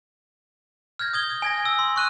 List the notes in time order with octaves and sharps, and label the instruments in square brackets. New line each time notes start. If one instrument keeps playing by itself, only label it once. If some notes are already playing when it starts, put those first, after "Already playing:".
[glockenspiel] F6 G6 G#6 A#6
D#6 G#6 G7
G#5 G#6 A#6
E6
C6
C#6 F#6 D#7